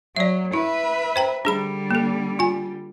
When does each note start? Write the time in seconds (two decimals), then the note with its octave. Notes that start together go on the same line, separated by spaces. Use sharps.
0.16 F#3 D5 E5
0.53 E4 B4 E5
1.16 C5 G5 A#5
1.45 D3 G3 D4 G#4 B5
1.91 A#3 A4
2.39 F4 G#5